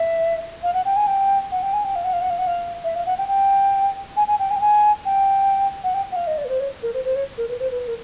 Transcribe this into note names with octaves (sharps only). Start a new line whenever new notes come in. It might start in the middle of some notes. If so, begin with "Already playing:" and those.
Already playing: E5
F5
F#5
G5
G#5
G5
F#5
G5
G#5
G5
F5
F#5
F5
F#5
F5
F#5
F5
E5
F5
F#5
G5
G5
G#5
G#5
G5
G#5
G5
G#5
G5
F#5
G5
F#5
F5
D#5
D5
B4
C5
C#5
A#4
C5
C5
C#5
A#4
B4
C5
B4
A#4